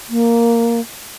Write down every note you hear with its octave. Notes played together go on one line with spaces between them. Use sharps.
A#3